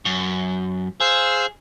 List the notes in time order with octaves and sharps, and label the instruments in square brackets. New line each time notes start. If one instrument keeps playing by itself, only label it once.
[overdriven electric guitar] F#2
[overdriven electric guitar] G#4 [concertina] C5 F5 E6